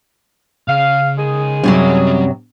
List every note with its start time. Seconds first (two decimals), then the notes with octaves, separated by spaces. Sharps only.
0.68 C#3 F5
1.18 D#3 G#3 G#4
1.63 F#2 C3 F#3 G3 B5